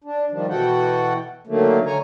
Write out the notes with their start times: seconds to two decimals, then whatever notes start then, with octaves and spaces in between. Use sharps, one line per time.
0.04 D4
0.32 D#3 F3 G3 D4
0.49 B2 E3 F#4 A4 F#5 G5
1.47 D3 D#3 F#3 A3 A#3
1.86 D3 C#5 G#5 A#5